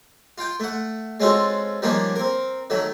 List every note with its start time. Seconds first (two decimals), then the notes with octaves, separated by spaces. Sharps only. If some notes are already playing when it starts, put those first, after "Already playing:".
0.38 F4 G5
0.60 A3 F#5
1.20 G#3 C4 C#4 F4 F#4 A4
1.82 D#3 F3 G3 A#3 C#4 D4
2.16 C4 A#4
2.70 D#3 F#3 A3